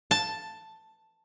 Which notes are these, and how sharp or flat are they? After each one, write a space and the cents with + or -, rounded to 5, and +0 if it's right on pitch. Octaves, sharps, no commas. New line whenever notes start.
A5 +5